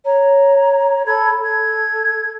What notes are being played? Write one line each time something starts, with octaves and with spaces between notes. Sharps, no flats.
C#5 A#5
A4 B5 G#6
A4 G#6